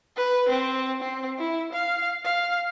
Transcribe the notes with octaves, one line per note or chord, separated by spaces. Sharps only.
B4
C4
C4
E4
F5
F5